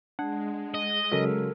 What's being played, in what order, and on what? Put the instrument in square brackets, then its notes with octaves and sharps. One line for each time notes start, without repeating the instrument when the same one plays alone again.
[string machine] G#3 [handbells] D4 [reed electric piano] F#5
[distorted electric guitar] D#5
[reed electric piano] C#3 F#3 F#4 [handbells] A4 A#4